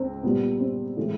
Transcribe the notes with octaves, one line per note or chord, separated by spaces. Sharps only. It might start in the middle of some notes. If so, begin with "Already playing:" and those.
Already playing: C#2 C4
A#2 G3 B3
C4
A2 E3 G#3